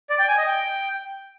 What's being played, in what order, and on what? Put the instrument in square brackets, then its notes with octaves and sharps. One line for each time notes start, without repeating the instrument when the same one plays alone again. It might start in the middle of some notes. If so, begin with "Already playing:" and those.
[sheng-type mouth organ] D5
G5
G#5
D#5
G5